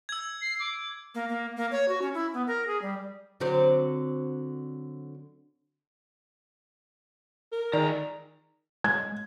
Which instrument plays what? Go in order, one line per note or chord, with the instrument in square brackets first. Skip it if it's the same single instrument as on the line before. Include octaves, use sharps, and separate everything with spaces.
[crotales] E6 G#6
[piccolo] C7
D6
[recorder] A#3
A#3
A#3
C#5
F#4
C#4
E4
B3
A#4
G#4
G3
[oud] D3 F#3 C4
[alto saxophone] A#4
[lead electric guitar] C#2 A#5 [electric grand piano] D#3 G#4 [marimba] D5
[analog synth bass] G#3 [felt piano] G#6